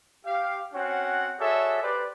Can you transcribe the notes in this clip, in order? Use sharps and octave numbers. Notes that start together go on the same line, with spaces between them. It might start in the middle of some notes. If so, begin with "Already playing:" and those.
G4 F5
C4 C#4 F#4 C#5 F#5
F#4 G#4 A4 C#5 D5 E5
G4 B4 C5 D5